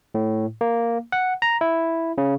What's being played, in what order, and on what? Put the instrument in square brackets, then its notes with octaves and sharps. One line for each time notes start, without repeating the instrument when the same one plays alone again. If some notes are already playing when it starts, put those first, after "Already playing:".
[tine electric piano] A2
A#3
F#5
A#5
E4
C#3